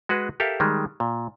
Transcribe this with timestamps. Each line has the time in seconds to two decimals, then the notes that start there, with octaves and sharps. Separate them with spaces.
0.09 G#3 F#4 G#4 B4
0.40 G4 A4 A#4 E5 F5
0.60 D#3 G3 G#3
1.00 A#2